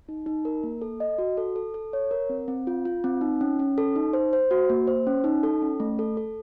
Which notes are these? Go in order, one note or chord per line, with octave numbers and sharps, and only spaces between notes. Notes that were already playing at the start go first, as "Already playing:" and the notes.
D#4
D#4
A#4
A#3
A4
D#5
F#4
A4
A4
A4
C#5
A#4
C4
C4
F4
F4
C4
D#4
C#4
C#4
A4
D#4
C5
C5
F#4
A#3
C5
C#4
D#4
A4
C#4
A3
A4
A4